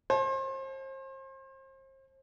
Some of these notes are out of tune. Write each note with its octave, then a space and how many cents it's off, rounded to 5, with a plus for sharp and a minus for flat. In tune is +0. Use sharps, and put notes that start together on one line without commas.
C5 +35 A5 -35